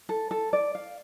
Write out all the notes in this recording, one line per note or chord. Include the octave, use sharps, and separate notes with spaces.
A4
A4
D5
F5